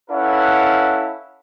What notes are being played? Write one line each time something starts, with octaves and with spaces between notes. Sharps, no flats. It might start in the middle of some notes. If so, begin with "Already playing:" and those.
C#4 E4 A4 B4 F5 F#5